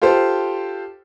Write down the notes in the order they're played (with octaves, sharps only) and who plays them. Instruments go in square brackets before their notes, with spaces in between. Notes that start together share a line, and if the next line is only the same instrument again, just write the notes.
[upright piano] F4 G4 A4 C5